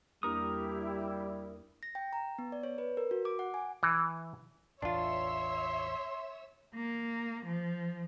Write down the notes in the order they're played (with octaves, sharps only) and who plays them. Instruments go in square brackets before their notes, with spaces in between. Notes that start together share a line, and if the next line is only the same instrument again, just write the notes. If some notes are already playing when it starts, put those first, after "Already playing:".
[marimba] E2 A#3 D4 [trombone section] G3 [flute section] E4 G4 [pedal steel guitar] A#4 D#6
[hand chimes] A#6
G5
A#5
B3
D5
C#5
B4
A#4
F#4
D6
F#5
G#5
[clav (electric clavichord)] E3
[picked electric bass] A1 E2 [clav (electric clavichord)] D4 F4 [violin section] C#5 E5 E6 [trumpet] C6
[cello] A#3
F3